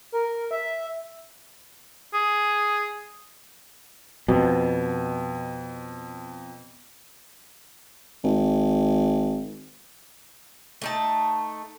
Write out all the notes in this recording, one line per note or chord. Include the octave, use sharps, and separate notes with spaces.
A#4
E5
G#4
F2 B2
G#1
A3 D#4 A5